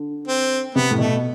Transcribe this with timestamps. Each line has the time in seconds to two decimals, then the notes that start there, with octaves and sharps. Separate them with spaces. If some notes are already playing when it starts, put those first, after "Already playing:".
Already playing: D3
0.28 C4
0.75 C3 B3
0.91 A2
0.99 B2 A3